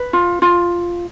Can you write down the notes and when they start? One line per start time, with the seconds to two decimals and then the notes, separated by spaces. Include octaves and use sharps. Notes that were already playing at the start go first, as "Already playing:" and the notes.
Already playing: B4
0.13 F4
0.42 F4